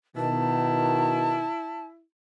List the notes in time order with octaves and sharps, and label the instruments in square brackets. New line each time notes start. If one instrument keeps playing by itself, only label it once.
[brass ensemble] B2 D#3 [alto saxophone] E4 [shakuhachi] A5